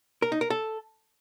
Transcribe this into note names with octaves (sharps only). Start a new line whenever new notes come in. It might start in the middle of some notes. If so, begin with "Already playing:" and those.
A#4
D#4
A#4
A4